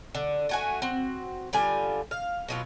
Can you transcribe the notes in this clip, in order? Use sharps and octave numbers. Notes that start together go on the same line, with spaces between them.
D3
A3 F#4 G#5
C4 F#4
D3 G3 F4 G#5
F5
B2 F#3 F4